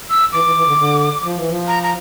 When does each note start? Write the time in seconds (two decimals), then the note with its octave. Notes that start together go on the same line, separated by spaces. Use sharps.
0.10 E6
0.32 E3 D6
0.44 E3
0.55 E3
0.66 D3
0.77 D3
1.23 F3
1.36 E3
1.49 F3
1.68 A#5
1.83 A#5